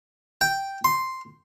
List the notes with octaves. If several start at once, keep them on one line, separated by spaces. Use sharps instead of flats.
G5
C6